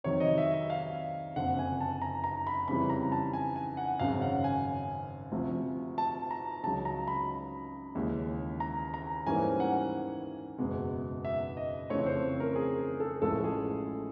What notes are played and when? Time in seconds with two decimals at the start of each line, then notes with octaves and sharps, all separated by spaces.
0.04 F2 C3 D#3 F#3 C#5
0.20 D#5
0.38 E5
0.54 E5
0.70 F5
1.36 F#1 F2 D3 F#5
1.59 G#5
1.81 A5
2.02 A#5
2.24 A#5
2.47 B5
2.68 F2 C#3 E3 G3 B5
2.90 A#5
3.12 A5
3.33 G#5
3.56 G#5
3.77 F#5
3.99 G#1 F#2 C#3 F5
4.22 F#5
4.44 G#5
5.32 D2 C3 F3
5.98 A5
6.31 A#5
6.63 C#2 C#3 F#3 A5
6.85 A#5
7.07 B5
7.95 D#2 C#3 E3 G#3
8.60 A#5
8.94 A#5
9.27 G#2 E3 G3 A#3 C#4 G#5
9.60 F#5
10.58 F#1 E2 B2 G#3
11.25 E5
11.57 D#5
11.90 F2 C#3 E3 A3 C4 C#5
12.06 C5
12.40 A#4
12.56 G#4
13.00 A4
13.22 A1 A2 F3 G#3 A4
13.44 G#4